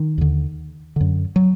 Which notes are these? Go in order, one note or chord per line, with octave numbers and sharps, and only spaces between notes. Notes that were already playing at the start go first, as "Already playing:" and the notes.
Already playing: D#3
D#2 D3
F#2 D3
F#3